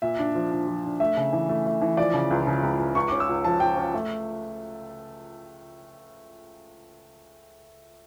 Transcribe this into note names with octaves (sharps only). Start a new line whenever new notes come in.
A#2 E5
D4
F3
D4
F3
D4
A3 E5
C#3
E3
A3
A3
E3
F3 D5
C#3
C#2
C#3
C#2
C#2
C#2 C#6
C#4 D6
E6
C#2
F3 A5
F3 G5
C#4
A3